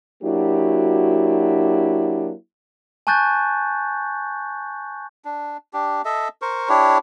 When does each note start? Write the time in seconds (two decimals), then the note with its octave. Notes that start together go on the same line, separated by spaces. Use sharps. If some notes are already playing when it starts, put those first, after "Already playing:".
0.24 F#3 A#3 D4 E4 F#4 G4
3.07 G#5 A5 C#6 F#6 G6 A6
5.25 D4
5.73 D4 G4
6.05 A4 D#5 E5
6.42 A#4 C5 C#6
6.69 D4 E4 G4 C#5